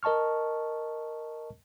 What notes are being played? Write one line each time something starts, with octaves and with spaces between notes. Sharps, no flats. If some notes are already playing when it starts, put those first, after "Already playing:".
A#4 D#5 A5 C#6 F6